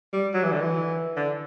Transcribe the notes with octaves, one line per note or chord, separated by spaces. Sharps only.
G3
F#3
E3
D3
E3
D3